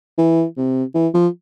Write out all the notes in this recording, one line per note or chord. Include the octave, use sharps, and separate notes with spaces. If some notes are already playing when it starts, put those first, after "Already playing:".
E3
C3
E3
F3